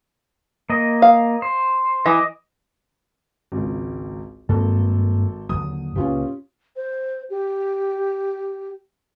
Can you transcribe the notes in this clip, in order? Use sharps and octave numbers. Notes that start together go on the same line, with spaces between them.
A#3 D#5
F5
C5
E3 D#5 D6
G#1 C#2
G#1 G2 A#3 A4
D#2 D3 F#3 D#6
C#2 A#2 C#4 F4 G4
C5
G4